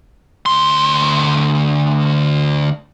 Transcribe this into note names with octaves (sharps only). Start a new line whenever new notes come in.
D2 C6